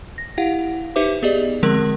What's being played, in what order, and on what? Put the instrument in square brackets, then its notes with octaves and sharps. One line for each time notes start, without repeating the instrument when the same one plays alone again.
[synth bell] A#6
E4 G4 F5 F#5
D#4 G4 B4 C5 E5 D6
B3 G4 G#4 D5 D#5
D3 F3 G#3 C4 A#4